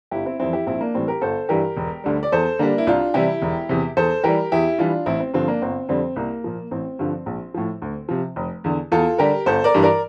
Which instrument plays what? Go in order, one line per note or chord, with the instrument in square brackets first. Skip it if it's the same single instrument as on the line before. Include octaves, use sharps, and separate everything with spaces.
[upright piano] G1 E4 G4
C4 E4
F2 E3 G3 C4 E4
E4 G4
A#1 C4 E4
A#3 D4
A2 E3 G3 C4
G4 A#4
G1 A4 C5
G2 E3 G3 G4 A#4
E1
D2 D3 G3
D5
E2 A4 C5
D3 G3 A#3 D4
E4
C2 D4 F4
C3 E3 G3 E4 G4
E1
E2 C3
E2 A4 C5
E3 G3 G4 A#4
E2 E4 G4
E3 G3 D4 F4
A1 C4 E4
C4
G2 D3 F3 C4
A#3 D4
G1 C4
F2 D3 G3 C4
C2 A#3
A#2 F3
A1 C4
G2 D3 F3
A#1
A2 F3
D2
C3 F3
F1
E2 D3
E2 F4 A4
D3 G3 G4 A#4
G1 A4 C5
A#4 D5
G2 E3 G3
A#4 D5